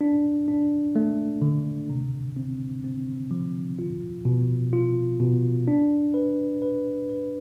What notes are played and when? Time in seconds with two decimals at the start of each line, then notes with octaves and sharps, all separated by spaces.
0.01 D4
0.48 D4
0.96 A3
1.42 D3
1.90 C3
2.36 C4
2.84 C4
3.31 F3
3.79 F4
4.25 B2
4.73 F4
5.20 B2
5.68 D4
6.14 B4
6.62 B4
7.09 B4